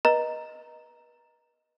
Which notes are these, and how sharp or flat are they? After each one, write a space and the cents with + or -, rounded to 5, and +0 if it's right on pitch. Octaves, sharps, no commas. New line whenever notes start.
B4 -30 D#5 +0 A#5 +0